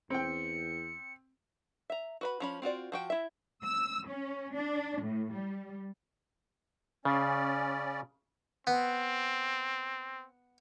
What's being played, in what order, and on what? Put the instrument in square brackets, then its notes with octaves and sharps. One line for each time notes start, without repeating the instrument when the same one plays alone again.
[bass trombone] E2 [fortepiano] C4 G5 [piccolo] C#7
[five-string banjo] E5 A#5
F#4 B4 B5
F3 C#4 B5
C4 F4 F#4 D5
F3 F#4 G5
E4 E5
[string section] E6
C#4
D4
A2
G3
[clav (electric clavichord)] C#3 [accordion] C#4 D5
[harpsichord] B3 [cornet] C4